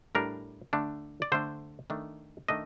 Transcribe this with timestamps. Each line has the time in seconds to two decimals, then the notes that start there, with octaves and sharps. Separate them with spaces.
0.15 A2 G3 D4 A#4
0.73 D3 A3 D4
1.22 D5
1.32 D3 A3 D4 C5
1.90 D#3 A3 D4
2.48 D#3 A3 D4 D#5